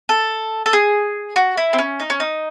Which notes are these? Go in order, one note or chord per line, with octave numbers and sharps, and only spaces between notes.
A4
A4
G#4
F#4
E4
C4
C#4
D#4
C#4
D#4